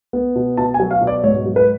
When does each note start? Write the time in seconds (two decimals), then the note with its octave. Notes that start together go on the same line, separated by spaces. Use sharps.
0.13 B3
0.36 B2
0.57 B2 A5
0.74 G#5
0.80 F#3
0.91 F5
1.01 B2
1.07 D5
1.23 G#2 C#5
1.46 F#3
1.56 B4